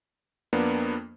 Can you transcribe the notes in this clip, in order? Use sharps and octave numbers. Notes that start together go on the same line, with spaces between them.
F2 A#3 B3 D4